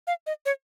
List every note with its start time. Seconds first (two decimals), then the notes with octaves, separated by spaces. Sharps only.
0.07 F5
0.27 D#5
0.46 C#5